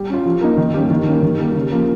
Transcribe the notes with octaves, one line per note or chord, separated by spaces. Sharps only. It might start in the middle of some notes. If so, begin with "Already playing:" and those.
Already playing: G3
C#4 F4
F3
A#3 D#4
D#3
G3 A#3 C#4
D#3
G3 A#3 C#4
D#3
G3 A#3
C#3
F3 A#3